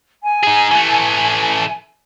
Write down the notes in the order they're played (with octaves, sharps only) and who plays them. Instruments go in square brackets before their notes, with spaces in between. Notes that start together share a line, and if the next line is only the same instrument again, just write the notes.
[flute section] G#5
[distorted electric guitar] D#4 G#4
E3 A3